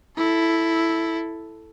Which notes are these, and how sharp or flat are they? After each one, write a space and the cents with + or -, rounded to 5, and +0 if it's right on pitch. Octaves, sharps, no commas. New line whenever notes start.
E4 +0 A4 +0